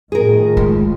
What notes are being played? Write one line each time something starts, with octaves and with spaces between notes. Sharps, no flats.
A2 D#3 F3 G#4 A#4
G#3